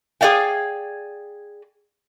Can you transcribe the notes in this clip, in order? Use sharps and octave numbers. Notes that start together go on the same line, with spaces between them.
G#4 A4 D5 F5 G5